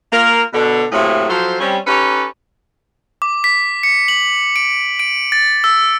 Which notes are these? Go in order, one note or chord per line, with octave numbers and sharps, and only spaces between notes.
A#3 F4 A#4
B2 D3
A2 C3 F#3 A#3 G#4 E5
F3 F#3 A4 C5
G3 C4 C#4
C#4 D#4 G4 A4 B4 C#5
D6
B6
C#7
F#7
D7
D7
A6
E6